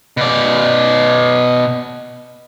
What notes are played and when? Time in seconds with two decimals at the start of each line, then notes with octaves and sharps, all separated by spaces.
0.17 B2 D5